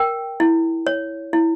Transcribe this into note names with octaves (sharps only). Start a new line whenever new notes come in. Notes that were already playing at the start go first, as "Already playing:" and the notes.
Already playing: A#4 G5
E4
C#5
E4